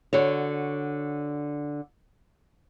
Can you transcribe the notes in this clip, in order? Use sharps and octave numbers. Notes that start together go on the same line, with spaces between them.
D3 F#4 C#5